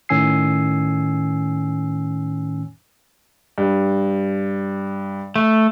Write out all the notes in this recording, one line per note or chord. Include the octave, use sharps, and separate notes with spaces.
A2 D#3 C#4 G#5 E6 C7
G2
A3